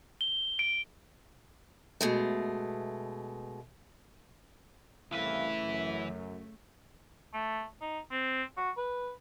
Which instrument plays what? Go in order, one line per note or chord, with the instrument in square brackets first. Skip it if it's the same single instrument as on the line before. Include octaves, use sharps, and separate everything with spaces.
[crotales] G7
D7
[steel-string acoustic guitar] B2 G#3 A3
[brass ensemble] C2 A2 F5 [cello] C#3 A3 [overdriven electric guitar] E3 B4 [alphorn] E4
[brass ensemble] F#2
[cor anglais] A3
D#4
C4
F#4
B4